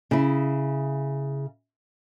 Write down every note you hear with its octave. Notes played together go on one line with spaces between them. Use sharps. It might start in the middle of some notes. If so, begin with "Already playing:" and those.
C#3 E4